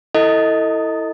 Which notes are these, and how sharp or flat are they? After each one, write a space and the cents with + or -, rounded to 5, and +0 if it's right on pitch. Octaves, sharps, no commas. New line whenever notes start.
E4 +0 A4 +25 D#5 +15